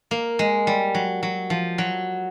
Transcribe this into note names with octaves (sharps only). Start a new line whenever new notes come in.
A#3
G#3
G3
F#3
F#3
F3
F#3